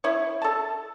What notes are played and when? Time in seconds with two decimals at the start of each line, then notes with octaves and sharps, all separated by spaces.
0.04 E4 C#5
0.42 A4 A5